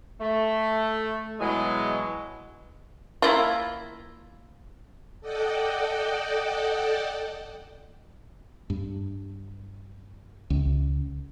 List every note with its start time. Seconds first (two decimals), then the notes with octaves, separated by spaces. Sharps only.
0.20 A3
1.40 B2 E3 F#3 G#3
3.22 A#3 E4 F4
5.20 A4 D5 D#5 F#5 G5
8.70 G2
10.50 C#2